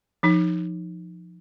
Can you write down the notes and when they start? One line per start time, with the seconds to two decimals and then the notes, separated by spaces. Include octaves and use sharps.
0.23 F3 D#4